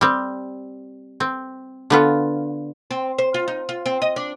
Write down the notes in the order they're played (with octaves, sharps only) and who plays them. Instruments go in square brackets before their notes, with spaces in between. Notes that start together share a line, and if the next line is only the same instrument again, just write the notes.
[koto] G3 C4
C4
D3 B3 F4
[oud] C4
C5
F4
D#4
F4
C4
D#5
D4